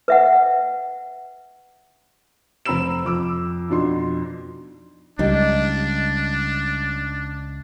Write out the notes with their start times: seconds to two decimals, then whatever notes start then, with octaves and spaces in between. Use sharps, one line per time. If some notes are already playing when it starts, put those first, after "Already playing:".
0.08 B4 E5 F#5
2.66 F1 C4 A#5 B5 E6 E7
3.05 F2 D6 E6
3.70 F2 B2 D4 D#4 C6
5.19 C#2 G3 D4 D#4